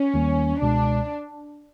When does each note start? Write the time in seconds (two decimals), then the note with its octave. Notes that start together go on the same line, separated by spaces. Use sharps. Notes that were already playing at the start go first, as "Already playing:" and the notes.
Already playing: C#4
0.14 D#2 D#3 G3 A#3
0.61 C#2 B2 G#3 D4